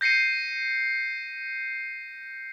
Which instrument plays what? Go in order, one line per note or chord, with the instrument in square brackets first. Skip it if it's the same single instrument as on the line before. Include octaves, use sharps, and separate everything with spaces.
[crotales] G6 A#6 C7 C#7 D#7